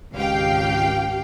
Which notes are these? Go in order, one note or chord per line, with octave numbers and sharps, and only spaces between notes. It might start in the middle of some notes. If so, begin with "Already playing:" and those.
G#1 C#2 G4 F5 G5